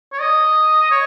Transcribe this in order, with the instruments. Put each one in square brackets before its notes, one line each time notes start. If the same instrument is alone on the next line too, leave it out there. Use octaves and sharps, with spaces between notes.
[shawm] C#5
D#5
C#5